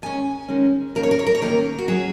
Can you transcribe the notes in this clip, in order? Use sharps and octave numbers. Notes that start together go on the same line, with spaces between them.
D#3 G#3 C#4 G#5
D#3 G#3 C#4
D#3 A#3 C#4 A#4
C#5
A#4
C#5
A#4
C#5
D#3 A#3 C#4 A#4
F#4
F#3 C#4 G#4